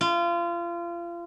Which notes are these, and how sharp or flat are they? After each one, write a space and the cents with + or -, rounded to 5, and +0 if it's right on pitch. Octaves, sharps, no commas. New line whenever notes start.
F4 -30